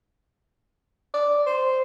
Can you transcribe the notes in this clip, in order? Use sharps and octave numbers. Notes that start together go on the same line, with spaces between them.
D5
C5